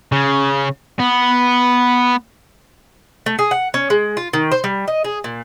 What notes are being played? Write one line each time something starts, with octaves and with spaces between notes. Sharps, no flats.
C#3
B3
A3
G#4
F#5
C#4
G#3
F4
D#3
C5
G3
D#5
G#4
A#2